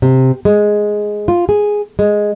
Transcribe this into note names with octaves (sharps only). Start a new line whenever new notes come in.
C3
G#3
F4
G#4
G#3